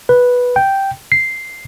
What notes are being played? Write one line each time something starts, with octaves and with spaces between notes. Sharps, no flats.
B4
G5
C7